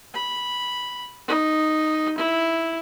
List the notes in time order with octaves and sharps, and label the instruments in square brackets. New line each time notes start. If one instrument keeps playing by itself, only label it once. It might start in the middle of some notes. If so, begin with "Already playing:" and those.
[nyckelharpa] B5
D#4
E4